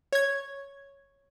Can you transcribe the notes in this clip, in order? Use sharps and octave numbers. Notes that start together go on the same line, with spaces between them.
C#5 G#6